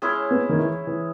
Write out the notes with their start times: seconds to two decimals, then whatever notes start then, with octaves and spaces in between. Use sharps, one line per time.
0.02 G#3 C#4 E4
0.31 B3
0.49 D#3
0.59 E3
0.87 E3